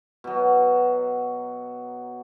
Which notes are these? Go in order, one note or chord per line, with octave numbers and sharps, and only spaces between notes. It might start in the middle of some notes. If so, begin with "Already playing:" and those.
B2 F#3